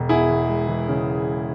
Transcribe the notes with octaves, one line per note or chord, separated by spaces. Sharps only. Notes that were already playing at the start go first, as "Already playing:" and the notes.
Already playing: E1
E2 E4 G#4
E2
G#3
E3
C#3